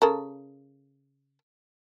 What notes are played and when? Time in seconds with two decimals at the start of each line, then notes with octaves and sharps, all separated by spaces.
0.02 C#3 A4 A#4